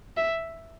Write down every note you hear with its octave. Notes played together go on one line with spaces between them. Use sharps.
E5